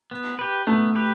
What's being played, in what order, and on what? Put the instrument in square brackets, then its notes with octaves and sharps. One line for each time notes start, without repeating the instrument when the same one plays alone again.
[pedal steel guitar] B3
G4 B4
[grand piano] A3 [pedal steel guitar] B3
[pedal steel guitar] G4 B4